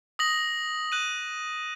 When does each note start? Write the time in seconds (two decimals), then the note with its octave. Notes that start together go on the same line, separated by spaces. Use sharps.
0.19 D#6 A#6 F#7
0.92 F#6 D#7 F#7